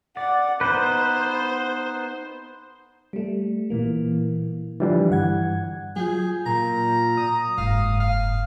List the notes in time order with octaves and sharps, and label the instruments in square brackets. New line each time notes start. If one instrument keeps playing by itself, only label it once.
[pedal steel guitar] D5 [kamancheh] F#5
[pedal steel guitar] B3 D#4 B4 [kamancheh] C5
[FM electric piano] G3 A3
A#2 E3 A#3
[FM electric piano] D3 F3 [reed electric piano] E3 G3
[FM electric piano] G2 F#5 G#6
[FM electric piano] F#3 F4 G6 [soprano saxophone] G#4
[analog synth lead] A#2 [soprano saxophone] A#5
[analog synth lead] D#6
[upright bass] F#1 [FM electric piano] G#2 [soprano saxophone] F5
[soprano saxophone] F5